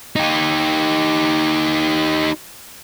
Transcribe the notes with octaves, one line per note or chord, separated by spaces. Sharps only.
D#4 G4